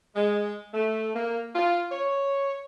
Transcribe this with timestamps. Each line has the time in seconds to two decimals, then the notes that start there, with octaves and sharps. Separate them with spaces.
0.16 G#3
0.74 A3
1.15 A#3
1.56 F4
1.91 C#5